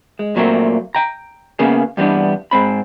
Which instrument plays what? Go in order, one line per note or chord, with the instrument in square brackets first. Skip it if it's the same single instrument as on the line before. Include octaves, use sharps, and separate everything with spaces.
[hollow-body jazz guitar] G#3
A#2 F#3 A3 A#3 C4
G5 A#5
C#3 A#3 B3 G#4
G2 E3 G3 A#3 B3 D4
G#2 C4 B5